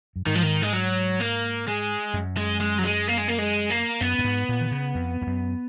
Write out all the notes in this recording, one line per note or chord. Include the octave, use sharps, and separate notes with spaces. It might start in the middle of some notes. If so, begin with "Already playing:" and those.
F#2
G#2 D#3
F3
D#3
G#3
F#3
A#3
G#3
F#2
G#3
G#3
F#3
G#3
A#3
G#3
A#3
G#3
A#3
F#2 B3
F#2
G#2
A#2
D#3
C#3
F2
F2
F#2